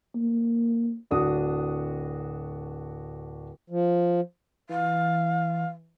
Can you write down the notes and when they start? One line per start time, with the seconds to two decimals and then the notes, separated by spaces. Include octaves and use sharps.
0.15 A#3
1.11 D1 D4 F#4 D#6
3.70 F3
4.69 E3 F5